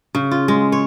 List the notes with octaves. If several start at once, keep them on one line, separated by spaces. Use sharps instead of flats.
C#3
F4
G#3
C#5